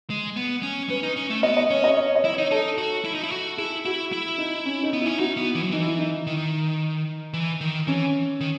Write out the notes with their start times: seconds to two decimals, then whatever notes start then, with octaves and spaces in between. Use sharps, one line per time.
0.10 G#3
0.36 B3
0.63 C#4
0.89 C#4 B4
1.03 D#4
1.16 C#4
1.30 A3
1.43 B3 D#5
1.57 D#5
1.70 C#4 C#5
1.84 D#5
1.97 C#5
2.15 D#5
2.24 E4
2.33 C#5
2.38 D#4
2.51 D#4 A4
2.78 F#4
3.05 E4
3.15 D#4
3.23 E4
3.32 F#4
3.58 E4 G#4
3.85 E4 F#4
4.12 E4
4.38 D#4
4.66 C#4
4.83 D#4
4.93 B3
5.01 C#4 E4
5.19 D#4 F#4
5.37 B3
5.55 E3
5.63 F#3
5.71 E3 D#4
5.86 E4
5.99 D#4
6.27 D#3
7.33 E3
7.61 D#3
7.87 E3 C#4
8.41 D#3